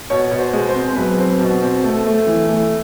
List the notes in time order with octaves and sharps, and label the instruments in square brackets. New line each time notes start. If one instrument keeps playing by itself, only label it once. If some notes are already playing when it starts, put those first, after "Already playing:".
[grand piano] B2 C#5
B2
C5
G#3
C5
C4
B1 B4
C4
B2
C4
A3 A4
A3
E3
A3